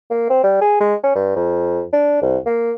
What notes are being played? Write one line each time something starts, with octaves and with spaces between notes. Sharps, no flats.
A#3
C4
G3
G#4
G#3
C#4
G2
F2
D4
C2
A#3